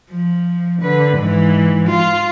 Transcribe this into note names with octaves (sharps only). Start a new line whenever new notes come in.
F3
D3 B4
G#2 E3
F4